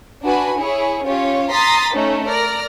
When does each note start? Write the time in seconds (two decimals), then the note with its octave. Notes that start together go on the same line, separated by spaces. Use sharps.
0.23 D4 F#4 B4 G#5 B5
0.59 E4 G#4 C#5
1.04 C#4 F4 G4 C#5
1.51 A#5 C6 D#6 A6 B6
1.94 A3 C#4 D#4
2.26 A#4 D5 F6 A#6